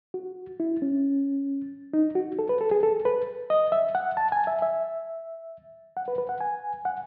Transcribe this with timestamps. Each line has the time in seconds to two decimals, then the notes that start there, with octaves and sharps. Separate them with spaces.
0.14 F#4
0.60 E4
0.82 C#4
1.93 D#4
2.15 F#4
2.39 A4
2.49 B4
2.61 A4
2.71 G#4
2.83 A4
3.05 B4
3.50 D#5
3.72 E5
3.95 F#5
4.17 A5
4.32 G#5
4.47 E5
4.62 E5
5.97 F#5
6.08 B4
6.18 B4
6.29 F#5
6.41 G#5
6.85 F#5